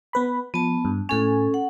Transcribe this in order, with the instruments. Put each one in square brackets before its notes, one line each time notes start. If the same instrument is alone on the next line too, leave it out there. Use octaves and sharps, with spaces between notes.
[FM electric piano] B3 B4 B5
[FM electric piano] F3 [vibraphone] B3 A5
[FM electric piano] G2
[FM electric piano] A2 G#5 [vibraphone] C#4 A4
[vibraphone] F#5